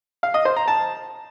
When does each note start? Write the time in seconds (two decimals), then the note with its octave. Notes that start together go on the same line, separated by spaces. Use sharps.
0.23 F5
0.34 D#5
0.45 C5
0.56 A#5
0.68 A5